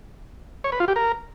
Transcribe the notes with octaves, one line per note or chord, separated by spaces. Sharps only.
C#5
B4
F4
G4
A#4